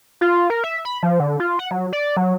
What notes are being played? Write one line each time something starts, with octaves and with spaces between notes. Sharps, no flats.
F4
A#4
E5
B5
F3
D3
F4
F#5
F#3
D5
F#3